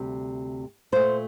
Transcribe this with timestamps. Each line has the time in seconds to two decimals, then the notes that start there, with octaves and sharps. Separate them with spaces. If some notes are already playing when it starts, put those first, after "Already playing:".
Already playing: D2 C3 G3
0.92 A#2 A3 C5